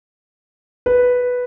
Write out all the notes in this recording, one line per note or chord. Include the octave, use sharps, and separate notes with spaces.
B4